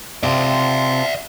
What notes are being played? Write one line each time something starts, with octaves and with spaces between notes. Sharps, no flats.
C3 C4 F4 D5 E5 A5